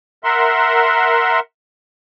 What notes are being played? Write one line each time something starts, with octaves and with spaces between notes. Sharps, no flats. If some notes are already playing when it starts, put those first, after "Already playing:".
A#4 E5 F#5 C6